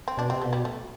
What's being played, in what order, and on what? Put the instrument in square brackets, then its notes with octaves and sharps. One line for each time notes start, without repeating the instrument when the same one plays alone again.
[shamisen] C4
[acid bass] B2 [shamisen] D4
[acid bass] C3 [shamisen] C4
[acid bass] B2 [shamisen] A3
[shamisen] G3
A3